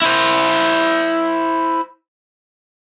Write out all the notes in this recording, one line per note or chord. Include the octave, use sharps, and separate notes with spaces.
E4 C5